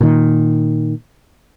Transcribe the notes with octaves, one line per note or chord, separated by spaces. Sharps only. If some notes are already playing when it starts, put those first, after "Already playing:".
A#2 D#3